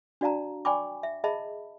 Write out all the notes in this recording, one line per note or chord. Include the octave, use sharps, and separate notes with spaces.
D4 F#4 D5 F5 A5 A#5
D5 G5 G#5 B5 C#6 D6
E5
G#4 D#5 E5 A5 B5